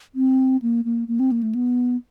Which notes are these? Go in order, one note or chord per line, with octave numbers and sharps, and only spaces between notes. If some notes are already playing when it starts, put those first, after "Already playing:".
C4
A#3
A#3
A#3
C4
A#3
A3
B3